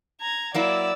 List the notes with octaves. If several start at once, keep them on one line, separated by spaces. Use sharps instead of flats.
A#5 G#6
F#3 A#3 E4 D5 E6